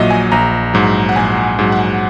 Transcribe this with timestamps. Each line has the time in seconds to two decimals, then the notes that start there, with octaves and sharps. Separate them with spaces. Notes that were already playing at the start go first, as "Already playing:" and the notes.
Already playing: A#1 A#2 F#3 D#5 E5
0.10 G#5
0.32 A#1 A#5
0.74 G#2 F#3
1.09 F#5
1.16 A#1 G#5
1.59 G#2 F#3
1.72 F#5